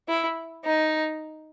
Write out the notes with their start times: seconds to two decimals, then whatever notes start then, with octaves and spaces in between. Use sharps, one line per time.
0.08 E4
0.65 D#4